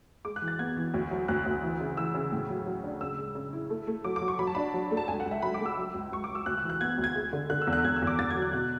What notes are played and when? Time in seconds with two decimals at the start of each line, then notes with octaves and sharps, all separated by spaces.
0.25 G#3 D6
0.36 F#6
0.42 E3
0.48 A6
0.59 B3 G#6
0.77 E3
0.94 D2
1.11 F#3
1.28 D2 F#6
1.46 D2
1.63 E3
1.80 C#3
1.97 E3 E6
2.15 C#3
2.32 A2
2.49 F#3
2.66 F#3
2.84 D4
3.01 C#3 E6
3.18 G#3
3.35 C#3
3.53 E4
3.70 A3
3.87 A3
4.04 F#3 D6
4.16 D6
4.22 F#3
4.28 C#6
4.39 F#3 B5
4.47 A5
4.55 D4 B5
4.74 F#3
4.91 A3
4.97 A5
5.08 C#2 G#5
5.20 F#5
5.26 C#2
5.31 E5
5.42 F#3 B5
5.54 D6
5.60 A3
5.66 E6
5.77 F#3
5.94 C#2
6.12 C#2 C#6
6.24 D6
6.29 C#2
6.35 E6
6.46 D2 F#6
6.58 E6
6.64 E3
6.70 F#6
6.81 B3 G#6
6.98 D2
7.04 G#6
7.15 G#3
7.33 D3
7.50 D3 F#6
7.62 E6
7.67 E2
7.73 F#6
7.84 E2 G#6
7.96 E6
8.02 E2
8.07 D6
8.19 E2 A6
8.30 G#6
8.36 F#3
8.42 F#6
8.53 B2 F#6